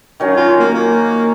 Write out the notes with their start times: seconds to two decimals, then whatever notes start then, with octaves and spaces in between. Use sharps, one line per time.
0.20 D#3 F#3 C#4
0.36 F4
0.59 A#3
0.74 A#3